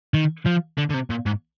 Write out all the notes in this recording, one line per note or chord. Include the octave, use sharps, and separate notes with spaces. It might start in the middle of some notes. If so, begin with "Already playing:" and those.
D#3
F3
D3
D3
C3
A#2
G#2